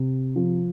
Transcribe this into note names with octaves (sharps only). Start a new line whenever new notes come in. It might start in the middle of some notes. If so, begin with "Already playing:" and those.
Already playing: C3
F3